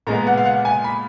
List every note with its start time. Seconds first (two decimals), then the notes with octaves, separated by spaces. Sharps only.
0.07 A#2 G#3 B3 A#5
0.27 F#5
0.37 F5
0.46 F#5
0.65 G#5
0.84 B5